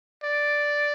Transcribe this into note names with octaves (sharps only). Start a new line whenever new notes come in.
D5